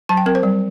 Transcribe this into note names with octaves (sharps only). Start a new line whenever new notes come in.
F#3 A5
G5
C4 A#4
C5
G3